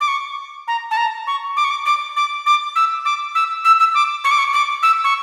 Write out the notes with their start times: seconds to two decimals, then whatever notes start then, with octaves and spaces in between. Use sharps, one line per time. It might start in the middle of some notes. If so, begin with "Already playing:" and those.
0.01 D6
0.08 C#6
0.68 A#5
0.91 A5
0.97 A#5
1.27 C#6
1.57 D6
1.64 C#6
1.71 D6
1.86 D6
2.16 D6
2.46 D6
2.76 E6
3.05 D6
3.35 E6
3.65 E6
3.80 E6
3.94 D6
4.24 C#6
4.31 D6
4.39 C#6
4.53 D6
4.83 E6
5.04 C#6